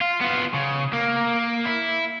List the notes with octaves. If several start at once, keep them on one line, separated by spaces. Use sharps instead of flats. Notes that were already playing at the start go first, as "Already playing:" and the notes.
F4
B3 F4
C#3
A#3
E4